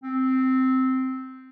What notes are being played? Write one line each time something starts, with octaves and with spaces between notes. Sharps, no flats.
C4